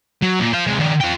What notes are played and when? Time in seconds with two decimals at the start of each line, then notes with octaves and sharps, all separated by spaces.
0.22 F#3
0.40 A#2
0.53 C5 F5
0.67 C3 G#3
0.80 D#3 D4
1.00 F4 G5